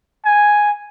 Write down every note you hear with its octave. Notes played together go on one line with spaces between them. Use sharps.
G#5